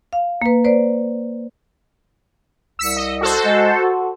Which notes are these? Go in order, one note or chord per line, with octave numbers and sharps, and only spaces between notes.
F5
A#3 B4
B4 C5 D5
C2 E6 B6 C#7
D#5
F#4 A4 C5
G#3
F#4